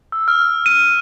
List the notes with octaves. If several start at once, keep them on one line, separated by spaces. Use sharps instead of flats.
E6
F6
D#7